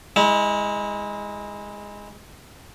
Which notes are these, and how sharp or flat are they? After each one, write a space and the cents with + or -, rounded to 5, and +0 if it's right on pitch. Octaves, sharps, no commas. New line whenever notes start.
G#3 -10 E4 -35